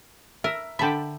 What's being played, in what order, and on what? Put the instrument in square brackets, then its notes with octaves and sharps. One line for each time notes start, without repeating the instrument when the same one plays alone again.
[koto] A#4 [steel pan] E5
[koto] D3 E5 [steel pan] G5 A5 B5